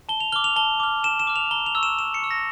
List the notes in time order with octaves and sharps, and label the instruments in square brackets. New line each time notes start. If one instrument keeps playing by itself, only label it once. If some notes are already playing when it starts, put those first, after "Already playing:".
[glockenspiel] A5 G7
F7
D6 F6 G7
F7
A5 G7
D6 F6
A5 E7
E7
D6 F6
F7
A#5 G7
F7
C#6 E6
E7
A#5 E7
C#7
C#6 E6
A#6